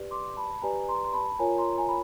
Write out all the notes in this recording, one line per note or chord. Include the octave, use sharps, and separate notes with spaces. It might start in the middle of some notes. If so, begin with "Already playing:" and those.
Already playing: G4 B4 D5
C6 D6
A5 B5
G4 B4 D5 G#5 A#5
A#5 C6
C6
A5 B5
F4 A#4 C#5 G#5 A#5
A#5 C6
G#5 A#5
B5